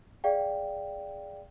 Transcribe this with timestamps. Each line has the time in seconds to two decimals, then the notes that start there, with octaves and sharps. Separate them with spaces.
0.24 G#4 D5 F5 G5